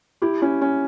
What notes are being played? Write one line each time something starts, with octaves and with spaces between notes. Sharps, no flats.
E4 G4
C#4 E4
C#4